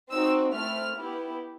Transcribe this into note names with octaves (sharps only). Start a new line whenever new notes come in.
C4 D#4 F#4 E6
A3 C4 E4 F6
B3 E4 G4